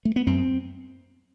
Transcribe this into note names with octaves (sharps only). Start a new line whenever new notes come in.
A3
B3
F#2 C4